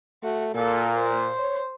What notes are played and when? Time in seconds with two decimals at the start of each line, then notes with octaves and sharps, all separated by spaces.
0.23 A3 F#4
0.54 A#2 A#3 A4
0.95 C5
1.39 C#5